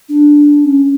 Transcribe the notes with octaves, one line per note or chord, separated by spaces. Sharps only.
D4
C#4